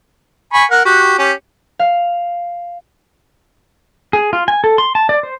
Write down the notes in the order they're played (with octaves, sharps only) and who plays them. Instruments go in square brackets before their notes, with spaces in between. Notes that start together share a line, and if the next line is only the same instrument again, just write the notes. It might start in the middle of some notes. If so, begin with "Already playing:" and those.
[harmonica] G#5 B5 C#6
A#4 F#5
F#4 G4
C#4 G4
[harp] F5
[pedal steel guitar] G#4
F4
G#5
A4
C6
A5
D5
C5